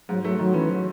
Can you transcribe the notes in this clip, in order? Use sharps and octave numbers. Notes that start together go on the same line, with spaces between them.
G#2 F#3
F#3 A3
D#3 F#3
E3 C#4
F#3